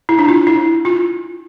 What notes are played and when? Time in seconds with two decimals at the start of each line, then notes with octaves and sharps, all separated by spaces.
0.09 E4
0.19 D4
0.28 F4
0.47 E4
0.85 F4